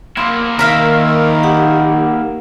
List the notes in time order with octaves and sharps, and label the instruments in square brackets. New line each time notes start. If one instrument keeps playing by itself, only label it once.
[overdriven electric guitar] A#3 E4 [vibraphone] C6
[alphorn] D#3 [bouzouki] A#4 E5 F5
[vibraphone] D#4 G4 F#5